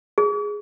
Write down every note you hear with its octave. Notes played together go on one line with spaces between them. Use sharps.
G#4